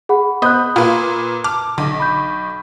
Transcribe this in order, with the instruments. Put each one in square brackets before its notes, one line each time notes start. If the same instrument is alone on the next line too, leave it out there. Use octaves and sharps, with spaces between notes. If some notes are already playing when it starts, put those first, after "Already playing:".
[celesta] G#4 F#5 B5
[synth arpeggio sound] B3 C5 D#5 [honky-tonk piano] B5 G6 [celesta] D#6 F#6
[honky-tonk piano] A#2 B4 [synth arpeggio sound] F4
[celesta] A5 [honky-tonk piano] D6 [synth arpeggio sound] F6
[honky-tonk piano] B1 [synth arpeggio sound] D3
[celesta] B5 G6